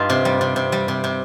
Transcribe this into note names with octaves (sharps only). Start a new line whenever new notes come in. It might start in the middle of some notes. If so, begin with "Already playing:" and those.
Already playing: G2 D#4 F4 G4
C3
G3
C3
C3
G3
C3
C3